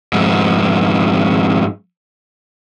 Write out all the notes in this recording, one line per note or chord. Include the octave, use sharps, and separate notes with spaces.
F2 G#2